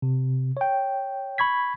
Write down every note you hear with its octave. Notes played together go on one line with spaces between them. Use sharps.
C3
C#5 G5
B5 C#6 G#6 B6